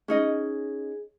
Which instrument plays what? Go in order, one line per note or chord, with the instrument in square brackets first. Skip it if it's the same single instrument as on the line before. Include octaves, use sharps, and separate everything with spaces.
[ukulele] C#4 D#4 D#5 [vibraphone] G#4